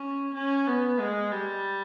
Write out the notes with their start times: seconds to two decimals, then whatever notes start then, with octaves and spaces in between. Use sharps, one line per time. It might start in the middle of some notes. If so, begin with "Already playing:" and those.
Already playing: C#4
0.34 C#4
0.67 B3
1.00 G#3
1.32 G3